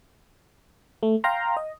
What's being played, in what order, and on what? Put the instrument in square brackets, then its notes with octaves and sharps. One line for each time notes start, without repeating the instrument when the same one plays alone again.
[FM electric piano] A3
F5 G5 A#5 C6
D#5